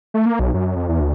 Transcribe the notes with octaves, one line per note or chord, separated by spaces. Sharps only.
A3
A#3
B1
F#2
F2
E2
D2